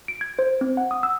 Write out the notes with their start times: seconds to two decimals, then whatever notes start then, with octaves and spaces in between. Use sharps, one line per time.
0.08 D7
0.21 G#6
0.39 C5
0.61 C4
0.77 F#5
0.91 D#6
1.03 E6